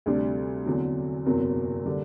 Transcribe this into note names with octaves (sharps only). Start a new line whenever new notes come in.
D2 C3 G3 D4
E2 D3 F#3 C4
F#1 E2 C3 F#3 C4
D3 G3